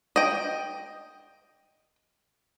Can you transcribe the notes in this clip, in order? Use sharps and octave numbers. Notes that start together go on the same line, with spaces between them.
D#5 G5